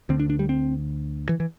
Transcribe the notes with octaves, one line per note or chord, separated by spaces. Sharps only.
D2 D3 C4
D4
D4
G3
C4
E3
E3